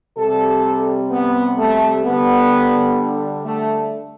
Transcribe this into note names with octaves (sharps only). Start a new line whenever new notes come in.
C3 G3 A4
B3
A3
D3 G3 B3
A3